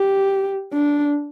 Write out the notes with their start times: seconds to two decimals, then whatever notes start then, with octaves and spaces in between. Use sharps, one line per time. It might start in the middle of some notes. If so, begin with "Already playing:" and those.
Already playing: G4
0.73 D4